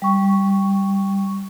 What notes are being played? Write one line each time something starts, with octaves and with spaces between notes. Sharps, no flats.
G3 C#6